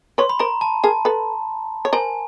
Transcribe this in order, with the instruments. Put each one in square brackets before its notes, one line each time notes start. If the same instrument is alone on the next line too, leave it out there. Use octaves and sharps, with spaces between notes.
[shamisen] B4 C#5 [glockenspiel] C6
[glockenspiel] B5
[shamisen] A#4 C5 [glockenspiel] A#5
[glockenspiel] A5
[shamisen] G#4 A#4 [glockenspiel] A5
[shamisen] A4 B4
C#5
[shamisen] A#4 C5 [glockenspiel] G#5